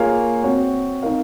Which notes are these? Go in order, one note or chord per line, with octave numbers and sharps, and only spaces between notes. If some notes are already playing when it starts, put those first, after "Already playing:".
Already playing: A#3 F4 G#4 C#5 F5
C4 F#4 C#5
C4 D#4 A#4 F5